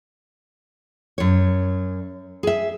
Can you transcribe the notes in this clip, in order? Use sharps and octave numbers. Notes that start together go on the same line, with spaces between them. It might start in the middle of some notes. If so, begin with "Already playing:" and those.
F#2 C#5
G#4 E5